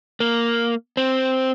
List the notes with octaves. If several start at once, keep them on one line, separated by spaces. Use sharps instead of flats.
A#3
C4